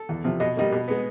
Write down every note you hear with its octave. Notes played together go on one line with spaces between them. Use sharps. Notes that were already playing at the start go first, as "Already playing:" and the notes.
Already playing: A4
E2
C3 F3
B2 D#5
G3 A#3 D#5
B2
G#3 B3